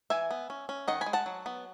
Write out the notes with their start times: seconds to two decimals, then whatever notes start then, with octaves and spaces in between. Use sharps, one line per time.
0.10 E3 E5 G#5
0.31 B3
0.50 C#4
0.69 C#4
0.88 D#3 D#5 F#5
1.01 G#5 B5
1.06 G#3
1.13 F#5 A5
1.26 F#3
1.46 B3